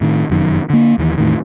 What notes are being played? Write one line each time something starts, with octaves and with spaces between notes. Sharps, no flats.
A2 D#3
F1 F#2 D#3
D3 A#3
D#2 D#3 E3
E2 A2 D#3